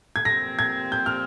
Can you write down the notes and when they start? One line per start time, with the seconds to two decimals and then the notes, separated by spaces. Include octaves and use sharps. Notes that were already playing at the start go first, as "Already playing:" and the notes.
0.16 G#6
0.25 A#2 F3 C4 G4 A#6
0.59 G#6
0.92 G6
1.06 F6